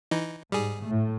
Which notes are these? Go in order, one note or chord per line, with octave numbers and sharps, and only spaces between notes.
E3 D#4
G#2 G3 G#4
A2 A3